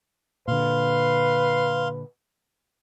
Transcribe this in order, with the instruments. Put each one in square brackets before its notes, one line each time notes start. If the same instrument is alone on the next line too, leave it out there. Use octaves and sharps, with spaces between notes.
[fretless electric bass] A#2 D3 [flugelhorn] B4 [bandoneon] F5 C6